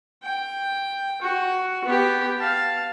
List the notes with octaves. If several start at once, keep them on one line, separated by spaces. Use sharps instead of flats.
G5
F#4
B3 G4
F5 A5